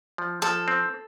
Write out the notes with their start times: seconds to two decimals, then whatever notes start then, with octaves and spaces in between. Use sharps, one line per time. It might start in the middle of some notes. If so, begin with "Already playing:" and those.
0.18 F3
0.42 F3 A4
0.68 C4